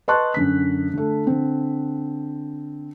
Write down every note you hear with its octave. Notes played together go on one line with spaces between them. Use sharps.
B4 D#5 A5 C6 C#6 F#6
F#2 D3 B6
D3 A3
D3 C4